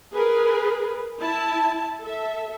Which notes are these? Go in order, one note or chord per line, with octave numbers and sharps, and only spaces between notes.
G#4 A#4 B4
E4 A5
A4 E5